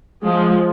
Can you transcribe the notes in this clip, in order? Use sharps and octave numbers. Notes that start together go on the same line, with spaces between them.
F3 G#3